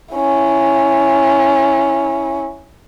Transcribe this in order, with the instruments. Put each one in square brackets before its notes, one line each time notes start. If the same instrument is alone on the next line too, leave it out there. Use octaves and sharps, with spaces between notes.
[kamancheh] C#4 E4